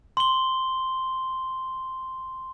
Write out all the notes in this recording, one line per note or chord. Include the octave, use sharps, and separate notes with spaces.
C6 G7